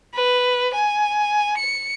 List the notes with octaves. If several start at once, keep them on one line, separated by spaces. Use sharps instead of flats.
B4
G#5
C#7